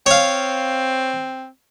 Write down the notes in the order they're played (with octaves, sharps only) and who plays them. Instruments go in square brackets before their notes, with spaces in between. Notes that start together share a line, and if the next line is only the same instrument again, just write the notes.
[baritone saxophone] C4 [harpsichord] C#5 F5